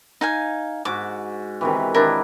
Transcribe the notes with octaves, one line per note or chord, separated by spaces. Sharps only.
D#4 F5 G#5
G#2 F#4 D6
C3 D#3 E3
D#3 D4 E4 A#4